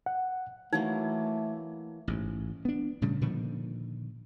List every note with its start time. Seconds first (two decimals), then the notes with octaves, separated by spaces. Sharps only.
0.06 F#5
0.73 E3 F#3 A3 A#3 D#4
2.08 A1 G#2
2.65 B3 D4
3.01 A2 C#3 G3
3.21 A#2 D3 D#3 F3